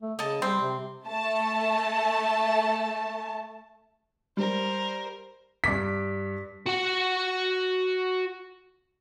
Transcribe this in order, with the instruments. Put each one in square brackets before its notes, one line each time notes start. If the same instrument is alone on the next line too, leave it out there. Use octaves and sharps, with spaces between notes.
[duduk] A3
[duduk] C#3 [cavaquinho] D#5 A5
[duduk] G3 [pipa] C4 [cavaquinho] C6
[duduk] C3
[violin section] A3 A5
[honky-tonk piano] G3 [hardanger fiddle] A#4 C5
[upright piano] G2 D6 B6
[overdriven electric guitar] F#4 F#5